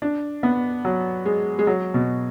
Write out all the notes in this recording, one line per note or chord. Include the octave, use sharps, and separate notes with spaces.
D4
B3
F#3
G#3
G#3
F#3
B2